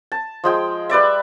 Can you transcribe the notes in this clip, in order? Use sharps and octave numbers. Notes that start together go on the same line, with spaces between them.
A5
F3 G#3 G5
G3 B4 D5 E5